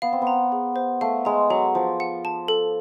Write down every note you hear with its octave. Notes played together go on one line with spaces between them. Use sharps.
B3 F5
C4
B3
A#5
G#4
C5
A3 F5
G#3 A#5
F#3 G#4
F3 C5
F#5
A5
A4